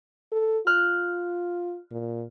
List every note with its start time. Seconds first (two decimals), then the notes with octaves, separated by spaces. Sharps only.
0.32 A4
0.67 F4 F6 F#6
1.91 A#2